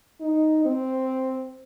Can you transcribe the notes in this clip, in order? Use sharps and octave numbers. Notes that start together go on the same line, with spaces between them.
D#4
C4